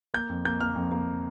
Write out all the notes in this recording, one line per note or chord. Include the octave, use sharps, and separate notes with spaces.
A#3 G6
F2
A#3 G6
A#3 F6
F2
A#3